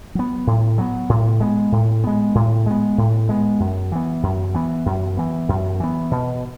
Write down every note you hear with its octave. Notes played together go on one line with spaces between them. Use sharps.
F#3 B3
A2
F#3 B3
A2
G#3 B3
A2
G#3 B3
A2
G#3 B3
A2
G#3 B3
F#2
E3 B3
F#2
E3 B3
F#2
E3 B3
F#2
E3 B3
B2